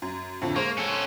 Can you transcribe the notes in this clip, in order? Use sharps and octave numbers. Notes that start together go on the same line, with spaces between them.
F#2
F2 A2 D3
G#3 A#3 C5 C#6
C#4 A4